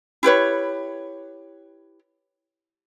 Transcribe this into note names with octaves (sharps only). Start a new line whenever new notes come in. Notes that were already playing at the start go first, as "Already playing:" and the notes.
E4 G4 B4 C#5